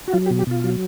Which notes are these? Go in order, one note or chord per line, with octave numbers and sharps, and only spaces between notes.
F#4
F#3 F4
G4
B2
G4
B2 F4
F#3